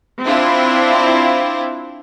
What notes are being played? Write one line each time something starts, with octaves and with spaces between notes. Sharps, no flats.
C4 D4 E4 F4